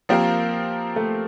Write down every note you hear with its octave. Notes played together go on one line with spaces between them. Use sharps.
F3 A#3 C4 G4 A#4
A3